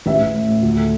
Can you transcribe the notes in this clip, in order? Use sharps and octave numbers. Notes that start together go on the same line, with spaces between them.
A1 E5
A1
A2
A2
D2
A3